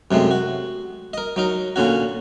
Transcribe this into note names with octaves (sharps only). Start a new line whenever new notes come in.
F#2 C3 G#3 A3
F#4
A#4 D#5
F#3 D#4 A#4
A#2 D3 C#4 F#4